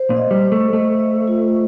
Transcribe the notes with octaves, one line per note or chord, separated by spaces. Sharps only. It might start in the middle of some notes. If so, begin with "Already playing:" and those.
Already playing: C5
A#2
D#5
G3
C5
A3
A3 D#5
D#5
F4